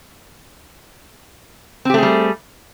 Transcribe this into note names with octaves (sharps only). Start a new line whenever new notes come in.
G3 A3 C4 G4 G#4